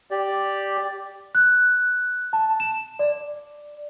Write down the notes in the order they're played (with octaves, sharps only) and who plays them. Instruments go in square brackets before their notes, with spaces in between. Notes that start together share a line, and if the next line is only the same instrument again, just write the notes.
[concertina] G4 D5
[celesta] F#6
A5
E7
D5